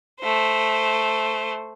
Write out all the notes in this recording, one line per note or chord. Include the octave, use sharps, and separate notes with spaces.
A3 C5